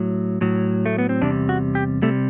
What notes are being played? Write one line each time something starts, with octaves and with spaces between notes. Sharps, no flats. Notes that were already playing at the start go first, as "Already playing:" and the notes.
Already playing: A2 F#3
A2 F#3
A3
B3
C4
E2 C3 G3 D4
F#4
G4
C3 G3 A3